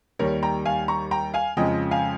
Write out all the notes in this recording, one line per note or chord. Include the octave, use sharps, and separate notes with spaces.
D#2 D#3 G3 A#4 C#5
G5 A#5
F5 G#5
A#5 C#6
G5 A#5
F5 G#5
F2 C#3 F3 G#3 D#5 G5
F5 G#5